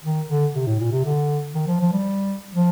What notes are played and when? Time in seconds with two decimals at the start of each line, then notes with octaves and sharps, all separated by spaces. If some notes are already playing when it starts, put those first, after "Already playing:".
0.04 D#3
0.29 D3
0.55 C3
0.67 A2
0.80 A#2
0.92 C3
1.05 D3
1.55 D#3
1.68 F3
1.81 F3
1.93 G3
2.55 F3